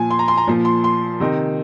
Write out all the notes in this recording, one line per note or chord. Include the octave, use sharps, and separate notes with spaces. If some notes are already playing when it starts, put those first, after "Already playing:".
Already playing: A#2 F3 G#5
C6
A#5
C6
A#5
A#2 F3
C6
C6
C3 D#3